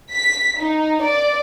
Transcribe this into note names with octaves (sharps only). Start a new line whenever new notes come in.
B6
D#4
D5